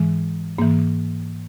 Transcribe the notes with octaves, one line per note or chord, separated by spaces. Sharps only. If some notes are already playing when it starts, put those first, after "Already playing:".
Already playing: G#2 E3 G#3
G#2 E3 A#3